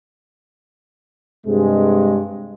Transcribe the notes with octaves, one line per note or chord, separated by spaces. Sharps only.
G2 C3 G#3